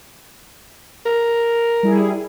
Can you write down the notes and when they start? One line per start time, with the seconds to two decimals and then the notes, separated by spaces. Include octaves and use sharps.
1.06 A#4
1.83 G3 E4 G#4